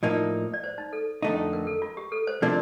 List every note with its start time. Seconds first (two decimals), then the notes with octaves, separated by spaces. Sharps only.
0.03 A2 F3 A#3 D#4 A#4 D5
0.53 D5
0.64 C5
0.78 D#4
0.93 A4
1.22 F2 D3 A3 D#4
1.53 A#4
1.67 A4
1.82 F4
1.97 G4
2.12 A4
2.27 C5
2.42 C3 F3 A3 D4 A#4 D5